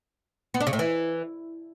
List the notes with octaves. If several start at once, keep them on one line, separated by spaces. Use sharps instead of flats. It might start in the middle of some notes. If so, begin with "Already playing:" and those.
B3
D4
C#3
A2
E3